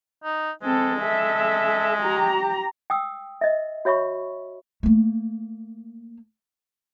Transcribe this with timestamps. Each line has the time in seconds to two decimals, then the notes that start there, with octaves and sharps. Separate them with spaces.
0.24 D#4
0.63 G#3 C4 A4
1.01 A4 E5
2.02 G4 A#5
2.90 G5 D#6 E6
3.41 D#5 E5
3.85 F#4 C#5 E5 B5 C#6
4.83 A3 A#3